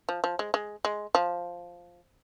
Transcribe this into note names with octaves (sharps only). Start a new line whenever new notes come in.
F3
F3
G#3
G#3
G#3
F3